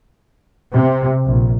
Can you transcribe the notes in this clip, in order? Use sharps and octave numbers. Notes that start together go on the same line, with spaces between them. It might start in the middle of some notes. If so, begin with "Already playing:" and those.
C3
A#1